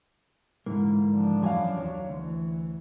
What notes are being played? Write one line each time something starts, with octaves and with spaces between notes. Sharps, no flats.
G#2 D3 E3 A#3
F3 D4
F#2 E3 F#4 F5 G#5
D#2 F#3 C#5
D2 E3